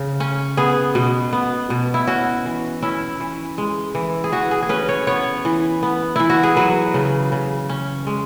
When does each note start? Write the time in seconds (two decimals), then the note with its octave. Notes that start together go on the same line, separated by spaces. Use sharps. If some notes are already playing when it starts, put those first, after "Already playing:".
Already playing: C#3
0.20 C#4
0.57 B3 G#4
0.95 B2
1.33 B3
1.70 B2
1.94 E4
2.07 C#4 F#4
2.45 E3
2.82 C#4 E4
3.20 E3
3.58 G#3
3.95 E3
4.24 G#4
4.32 E3 F#4
4.51 G#4
4.62 G#4
4.69 C#4 B4
4.89 C#5
5.07 B3 C#5
5.45 E3
5.83 B3
6.16 E3 E4
6.30 F#4
6.43 G#4
6.56 F#3 B4
6.94 C#3
7.32 C#3
7.69 C#4
8.07 G#3